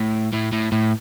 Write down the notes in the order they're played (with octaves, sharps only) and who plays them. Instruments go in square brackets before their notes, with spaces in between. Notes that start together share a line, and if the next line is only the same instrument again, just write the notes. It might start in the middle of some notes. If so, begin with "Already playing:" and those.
Already playing: [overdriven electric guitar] A2
A2
A2
A2